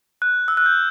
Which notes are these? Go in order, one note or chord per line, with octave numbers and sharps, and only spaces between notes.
F#6
E6
F#6
G6